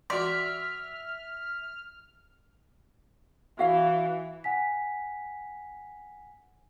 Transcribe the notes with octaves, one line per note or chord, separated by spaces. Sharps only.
F#4 D5 E5 C6 F6
E3 F#4 F5
F#5 G#5 B6